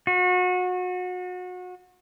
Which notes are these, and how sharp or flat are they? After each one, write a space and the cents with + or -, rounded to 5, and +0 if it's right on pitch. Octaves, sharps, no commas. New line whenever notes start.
F#4 -30